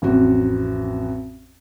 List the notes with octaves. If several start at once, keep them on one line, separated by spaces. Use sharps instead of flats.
A1 F2 F#4